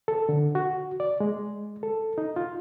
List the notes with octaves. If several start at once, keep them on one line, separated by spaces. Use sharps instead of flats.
A4
D3
F#4
D5
G#3
A4
D#4
F4